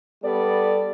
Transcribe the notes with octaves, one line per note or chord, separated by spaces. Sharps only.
G3 B3 A4 D5